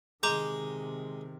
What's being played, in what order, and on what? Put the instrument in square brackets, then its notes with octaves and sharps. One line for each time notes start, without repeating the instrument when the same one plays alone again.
[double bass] C3 D#3 [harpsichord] G#3 [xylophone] A#5 D6 G6